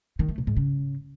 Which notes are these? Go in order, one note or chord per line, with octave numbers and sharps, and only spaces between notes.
D#3
A3
B2
G#2
C#3